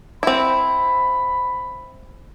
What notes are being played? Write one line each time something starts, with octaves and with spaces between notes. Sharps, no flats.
C4 E4 B5